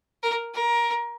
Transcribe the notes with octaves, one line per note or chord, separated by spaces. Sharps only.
A#4
A#4